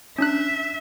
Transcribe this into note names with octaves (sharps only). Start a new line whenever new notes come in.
C#4 D4 E5 F#6